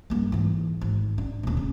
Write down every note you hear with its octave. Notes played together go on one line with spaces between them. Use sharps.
G2 A#3
G#2 E3
G#1
D4
D1 A#2
C#3